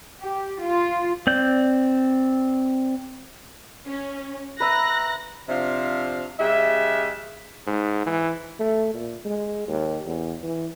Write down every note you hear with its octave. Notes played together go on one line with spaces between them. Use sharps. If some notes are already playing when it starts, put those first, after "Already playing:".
G4
F4
C4 D5 G6
C#4
B4 E5 A#5 F#6 A#6
C3 F3 D4 E5 F5
C#3 G#3 G4 E5
G#2
E3
A3
A#2
G#3
D#2
E2
E3